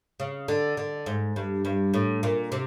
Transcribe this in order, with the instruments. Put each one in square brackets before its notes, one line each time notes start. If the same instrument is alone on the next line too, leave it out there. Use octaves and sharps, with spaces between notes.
[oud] C#3
D3
D3
G#2
G2
G2
A2
A#2
C3